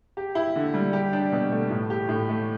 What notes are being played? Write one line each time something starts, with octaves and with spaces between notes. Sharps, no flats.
G4
E4
D3
G3
G4
D4
B2
A3
A2
G4
A2
A3